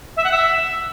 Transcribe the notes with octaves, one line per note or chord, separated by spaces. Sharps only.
E5
F#5
E5